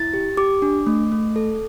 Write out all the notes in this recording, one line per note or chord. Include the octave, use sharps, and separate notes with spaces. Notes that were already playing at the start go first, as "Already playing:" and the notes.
Already playing: E4 A6
G4
G4 D6
D4
A3
A3
A4